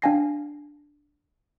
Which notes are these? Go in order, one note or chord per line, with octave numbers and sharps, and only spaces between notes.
D4 F5 G5 G#5 A#6 C7